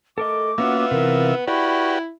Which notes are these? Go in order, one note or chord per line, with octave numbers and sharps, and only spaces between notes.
A3 A4 A#4 D#5 D6
A#3 B3 C#4 F4 F#4 E5
C3 E3 A#4
E4 F#4 G4 B4 D5 C#6